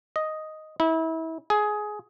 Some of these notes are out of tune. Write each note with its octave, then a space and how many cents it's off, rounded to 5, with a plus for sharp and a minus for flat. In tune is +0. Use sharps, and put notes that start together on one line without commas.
D#5 +0
E4 -30
G#4 +15